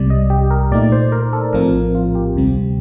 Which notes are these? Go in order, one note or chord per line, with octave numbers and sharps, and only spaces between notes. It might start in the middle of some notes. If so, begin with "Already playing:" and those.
Already playing: C2 C3 G3 D5
D#5
G4
A#4
A#2 A3 D#4 D5
C5
A#4
A4
A#1 A2 F3 C4 F4 A#4
F4
G4
D2 C3 G3 C4